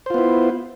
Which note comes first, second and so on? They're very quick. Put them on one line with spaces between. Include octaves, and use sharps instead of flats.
C5 F4 B3 E4